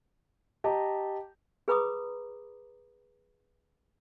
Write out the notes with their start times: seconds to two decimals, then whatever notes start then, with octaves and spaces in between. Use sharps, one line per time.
0.64 G4 D#5 A5 A#5
1.68 G#4 B4 A#5 B5 D6 D#6